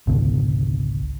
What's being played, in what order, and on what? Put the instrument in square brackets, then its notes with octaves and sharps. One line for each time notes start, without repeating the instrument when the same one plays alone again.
[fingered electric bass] G#1 C#2 B2 D3